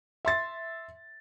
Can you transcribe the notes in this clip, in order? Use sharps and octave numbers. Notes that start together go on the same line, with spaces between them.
E5 C6 A6